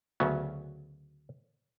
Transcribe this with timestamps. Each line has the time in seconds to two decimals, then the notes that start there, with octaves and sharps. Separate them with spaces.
0.20 D2 C#3 F#3 B3 C#4